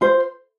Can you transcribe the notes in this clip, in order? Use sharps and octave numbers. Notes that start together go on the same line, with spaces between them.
F4 C5